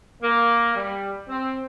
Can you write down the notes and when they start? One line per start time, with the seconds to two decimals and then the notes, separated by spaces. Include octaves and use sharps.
0.23 A#3
0.75 G3
1.29 C4